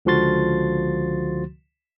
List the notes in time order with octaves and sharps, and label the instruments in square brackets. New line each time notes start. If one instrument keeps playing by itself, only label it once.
[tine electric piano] C#2 D3 F3 F#4 C6 A6